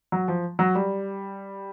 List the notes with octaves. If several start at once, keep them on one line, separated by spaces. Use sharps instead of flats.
F#3
F3
F#3
G3